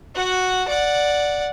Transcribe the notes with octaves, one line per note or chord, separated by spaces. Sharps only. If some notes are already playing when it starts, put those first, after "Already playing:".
F#4 F#5
D5 F#5